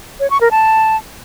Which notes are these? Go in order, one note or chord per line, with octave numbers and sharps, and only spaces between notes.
C#5
C#6
A#4
A5